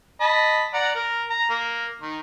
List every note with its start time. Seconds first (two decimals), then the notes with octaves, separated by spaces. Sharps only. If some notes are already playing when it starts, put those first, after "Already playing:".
0.21 D#5 A5 B5
0.74 D5 F#5 A#5
0.95 A#4
1.30 A#5
1.50 A#3
2.01 D#3